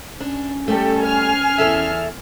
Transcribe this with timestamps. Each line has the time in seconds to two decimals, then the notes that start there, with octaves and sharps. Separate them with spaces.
0.20 C#4 D4
0.68 G3 A3 G4 A4
1.04 G#5 F6 C7
1.58 E2 A4 E5